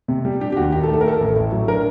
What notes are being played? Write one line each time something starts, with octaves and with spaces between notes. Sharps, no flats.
C3
G3
D4 G4
G4
D#2 F#4
D#3 G4
A4
A3
A4
A#4
A3 A4
A1
A2
F#3
D4 A#4